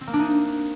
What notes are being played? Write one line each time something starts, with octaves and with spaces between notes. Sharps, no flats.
C4
A#3
D4
D#4